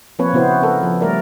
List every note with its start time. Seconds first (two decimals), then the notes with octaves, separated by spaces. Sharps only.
0.19 F3 A#3 C4 B4 C#5
0.33 C#3 B3 E4 F#4 C5
0.63 A4 A#4
0.83 F3
1.01 G3 A3 A#4 D5